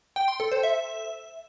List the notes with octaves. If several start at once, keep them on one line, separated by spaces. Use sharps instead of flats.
G5
C6
A4
C5
E5